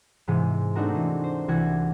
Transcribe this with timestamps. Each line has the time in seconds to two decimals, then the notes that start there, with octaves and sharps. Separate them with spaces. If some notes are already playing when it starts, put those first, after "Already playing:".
0.27 G#2 C3 E3 G#3
0.75 A3 C4 D4 D#4 F#4 A#4
0.95 E3
1.24 C5
1.48 C2 E3 F#4 G#6 C#7